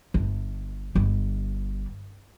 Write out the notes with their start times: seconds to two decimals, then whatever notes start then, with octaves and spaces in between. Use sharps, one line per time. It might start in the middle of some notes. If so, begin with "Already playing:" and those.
0.14 G1
0.95 G1